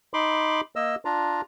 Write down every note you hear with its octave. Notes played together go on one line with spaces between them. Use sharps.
D#4 B5 C6 D6
A#3 D#5 E6
D4 F4 A#5